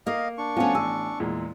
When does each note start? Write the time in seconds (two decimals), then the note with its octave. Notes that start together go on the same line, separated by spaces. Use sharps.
0.07 A#3 A#4 D#5 F5
0.38 D4 C#6
0.57 F3 A3 B3 C#4 F5 G#5
0.75 A1 G#5 E6
1.20 E2 A#2 G#3